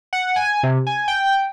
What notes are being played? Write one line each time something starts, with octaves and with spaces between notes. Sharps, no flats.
F#5
G#5
C3
G#5
G5